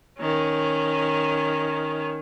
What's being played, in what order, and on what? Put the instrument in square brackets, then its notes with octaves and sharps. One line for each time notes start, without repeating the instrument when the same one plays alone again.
[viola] D#3 C#4